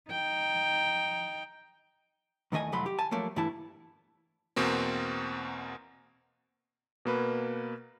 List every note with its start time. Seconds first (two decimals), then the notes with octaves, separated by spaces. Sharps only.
0.10 D#4 G5
2.52 E2 D#3 A3 D#5 G#5
2.72 C2 F2 F#3 A3 B5 C6
2.86 G4
2.99 G#5 A5
3.11 F3 F#3 A3 A#3
3.36 G2 E3 A3 E4 A5
4.56 E2 B2 A#3 C4
7.05 B2 A#3 B4